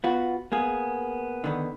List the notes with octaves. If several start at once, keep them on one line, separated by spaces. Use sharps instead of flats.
B3 F4 F#4
A#3 B3 G#4
D3 D#3 B3